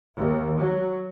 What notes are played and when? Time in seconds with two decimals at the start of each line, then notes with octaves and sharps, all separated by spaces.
0.17 D#2
0.58 F#3